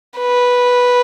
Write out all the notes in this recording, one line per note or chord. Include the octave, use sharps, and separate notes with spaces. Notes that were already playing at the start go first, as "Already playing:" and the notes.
B4